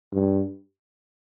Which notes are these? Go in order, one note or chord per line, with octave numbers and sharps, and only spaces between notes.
G2